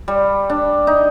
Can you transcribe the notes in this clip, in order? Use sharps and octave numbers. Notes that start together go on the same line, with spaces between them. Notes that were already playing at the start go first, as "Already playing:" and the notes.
G3
D4
D#4